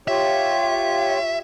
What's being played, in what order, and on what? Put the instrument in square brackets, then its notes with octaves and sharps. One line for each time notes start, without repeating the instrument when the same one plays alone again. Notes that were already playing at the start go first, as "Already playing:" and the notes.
[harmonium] F4 G4 C#5 [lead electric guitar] E5